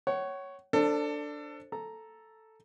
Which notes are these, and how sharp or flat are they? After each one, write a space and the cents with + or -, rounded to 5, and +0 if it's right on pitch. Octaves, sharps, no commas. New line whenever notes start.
C#5 +0 F#5 +35
D4 +0 A4 +25 C5 +20
A4 +0 A#5 +0